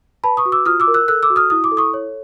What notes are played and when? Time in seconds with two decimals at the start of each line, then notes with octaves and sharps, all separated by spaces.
0.24 B4 A5 B5
0.37 C#6 D#6
0.46 F#4
0.52 D6 E6
0.66 F4 D#6 F6
0.80 D6 E6
0.88 A#4
0.94 E6 F#6
1.08 A4 E6 F#6
1.23 D6 E6
1.30 F#4
1.36 D#6 F6
1.50 E4 D#6
1.64 D6
1.72 A4
1.77 C#6 D#6
1.94 C#5